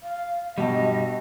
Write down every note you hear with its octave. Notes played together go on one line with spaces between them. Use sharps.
F5
G2 B2 G3 F#4 A4 D#5 G5